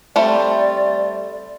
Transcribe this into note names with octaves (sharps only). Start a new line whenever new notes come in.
G3 A3 C4 D5